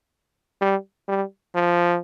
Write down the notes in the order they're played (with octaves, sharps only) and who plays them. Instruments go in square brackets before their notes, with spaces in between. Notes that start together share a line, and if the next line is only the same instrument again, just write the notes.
[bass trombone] G3
G3
F3